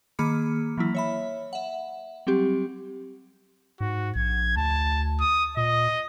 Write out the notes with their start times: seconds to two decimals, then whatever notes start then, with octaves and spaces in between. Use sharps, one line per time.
0.19 D#3 A#3 G#4 B5 D6 C#7
0.77 E3 F#3 A#3 E4
0.95 C#5 E5 B5
1.53 E5 F#5
2.27 F#3 G3 C4 G4
3.80 G#2 F#4
4.16 A#1 G#6
4.57 D2 A5
5.20 D#6
5.57 A#2 D#5